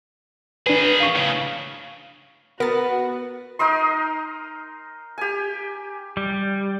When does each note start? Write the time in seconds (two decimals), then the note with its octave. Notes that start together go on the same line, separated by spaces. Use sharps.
0.67 D#3 D4 G#4 B4
1.00 F5 C#6
1.16 A2 C#3
2.60 B3 F#4 A#4 A6
3.59 D#4 A#4 D#5 C6
5.18 G4 G#5
6.17 G3